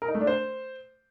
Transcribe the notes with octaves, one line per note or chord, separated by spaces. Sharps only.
A#4
D#4
A3
D4
C5